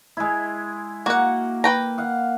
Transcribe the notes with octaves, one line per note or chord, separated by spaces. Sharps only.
G#3 E4
A#3 F#4 F#5
B4 G5 A#5
F5 F#5